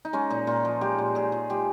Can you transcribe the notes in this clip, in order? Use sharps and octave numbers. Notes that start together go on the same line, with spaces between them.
D#4
G#3 C#4
A#2 D#4
A#2 F4
F3
G#3 G4
A#2
A#2 G#4
F3
G#3 G4